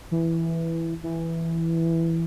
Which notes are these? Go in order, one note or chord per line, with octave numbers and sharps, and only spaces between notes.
E3
E3